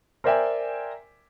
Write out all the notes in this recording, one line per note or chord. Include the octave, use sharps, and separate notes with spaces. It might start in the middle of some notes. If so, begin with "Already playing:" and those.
A#4 C5 D5 E5 G5 G#5